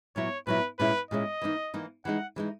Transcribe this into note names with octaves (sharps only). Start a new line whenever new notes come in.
A#2 F#3 B3 E4 C#5
A#2 F#3 B3 E4 B4
A#2 G#3 C#4 E4 B4
A#2 G#3 C#4 E4 D#5
E3 A#3 D#4
E3 A#3 D#4
E3 G#3 D#4 F#5
E3 G#3 D#4